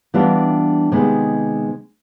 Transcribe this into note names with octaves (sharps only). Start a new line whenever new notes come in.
E3 G3 B3 D4 F4
C3 D#3 G#3 B3